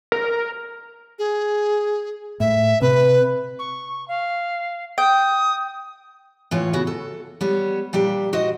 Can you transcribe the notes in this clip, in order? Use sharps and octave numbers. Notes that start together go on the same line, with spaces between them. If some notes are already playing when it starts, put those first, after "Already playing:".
A#4
G#4
A2 E5
C3 B4
C#6
F5
G5 D#6
A2 E3 F4 C#5
C#3 B3 F#4
A4
G3 B3 C#5
A#2 G3 D4 G4
F#4 C5 D#5